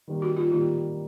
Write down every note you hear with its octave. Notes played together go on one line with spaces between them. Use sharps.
D#3 G3 A#3
F#4
F4
D#3 G3 A#3 F4